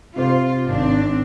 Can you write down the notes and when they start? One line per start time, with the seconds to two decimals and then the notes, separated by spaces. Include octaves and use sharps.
0.16 C3 F4 C5
0.65 G#1 C4 D4